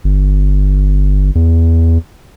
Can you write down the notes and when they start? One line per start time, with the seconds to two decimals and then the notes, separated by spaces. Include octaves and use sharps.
0.04 G1
1.35 E2